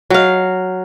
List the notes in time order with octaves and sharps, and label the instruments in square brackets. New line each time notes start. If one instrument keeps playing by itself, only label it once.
[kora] F#3 F5